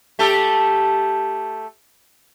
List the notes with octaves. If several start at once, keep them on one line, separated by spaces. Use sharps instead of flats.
A3 G4 A4